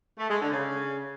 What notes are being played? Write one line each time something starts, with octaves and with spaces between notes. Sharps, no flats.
A3
G#3
D3
C#3